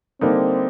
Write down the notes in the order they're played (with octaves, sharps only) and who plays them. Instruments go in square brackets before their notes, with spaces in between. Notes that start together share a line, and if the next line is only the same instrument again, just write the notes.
[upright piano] D3 G3 A#3 D#4 [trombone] C4